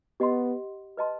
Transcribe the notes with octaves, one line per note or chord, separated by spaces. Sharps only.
B3 G4 D#5 F#5 C6
B4 D#5 A5 C6